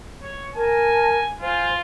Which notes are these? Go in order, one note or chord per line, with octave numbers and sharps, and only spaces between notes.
C#5
A#4 G#5 A5
F4 C5 G#5